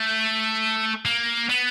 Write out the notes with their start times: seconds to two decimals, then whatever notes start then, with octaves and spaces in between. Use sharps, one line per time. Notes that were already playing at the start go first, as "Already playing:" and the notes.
Already playing: A3
1.05 A#3
1.50 B3